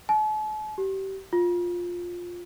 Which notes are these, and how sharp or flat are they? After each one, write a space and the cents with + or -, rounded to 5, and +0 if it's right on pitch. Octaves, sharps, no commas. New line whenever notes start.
A5 -45
G4 -30
F4 +10